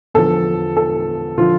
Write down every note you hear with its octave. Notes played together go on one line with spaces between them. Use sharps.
E2 D3 F3 A4
A4
D3 F3 F4